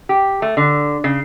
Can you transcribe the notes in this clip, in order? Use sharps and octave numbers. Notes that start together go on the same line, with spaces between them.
G4
A3
D3
C#3